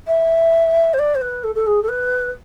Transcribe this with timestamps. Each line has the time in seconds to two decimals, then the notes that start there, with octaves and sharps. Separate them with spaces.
0.07 E5
0.93 C5
0.98 D5
1.15 C5
1.21 B4
1.43 A4
1.55 A4
1.66 G#4
1.82 A4
1.88 B4